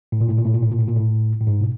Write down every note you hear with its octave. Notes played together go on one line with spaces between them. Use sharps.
A2
A#2
A2
A#2
A2
A#2
A2
A#2
A2
A#2
A2
A2
G#2
B2